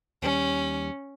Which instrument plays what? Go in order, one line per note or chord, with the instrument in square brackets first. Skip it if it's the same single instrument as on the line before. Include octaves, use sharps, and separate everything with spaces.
[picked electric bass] D#2 G3 [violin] C#4